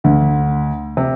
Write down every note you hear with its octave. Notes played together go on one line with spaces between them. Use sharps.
D2 D3
C3